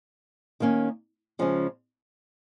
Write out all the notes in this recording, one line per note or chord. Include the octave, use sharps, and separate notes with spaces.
D#3 A#3 C#4
C#3 F3 G#3 C#4